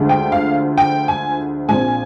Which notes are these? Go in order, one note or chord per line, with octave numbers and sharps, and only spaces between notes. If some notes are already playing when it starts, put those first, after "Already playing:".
Already playing: D2 D3 F3 G#3
G5
F5
G5
G#5
A#1 A#2 F3 C4 G#5